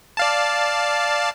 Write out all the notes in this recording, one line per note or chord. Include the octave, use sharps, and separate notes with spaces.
D5 F5 A5